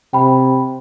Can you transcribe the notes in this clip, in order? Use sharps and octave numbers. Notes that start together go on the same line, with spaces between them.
C3 G5 B5